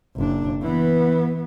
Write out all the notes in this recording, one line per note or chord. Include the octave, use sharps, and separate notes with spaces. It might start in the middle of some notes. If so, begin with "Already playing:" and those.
F#1 D4
E3 B3